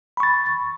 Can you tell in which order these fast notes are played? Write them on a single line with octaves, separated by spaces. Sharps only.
B5 C#6 A6